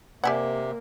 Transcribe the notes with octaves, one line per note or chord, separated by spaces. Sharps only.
C3 A#3 G4 D5 E5 F#5 G#5